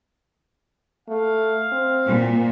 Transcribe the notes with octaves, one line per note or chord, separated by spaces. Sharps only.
A3 F5
C4
A#2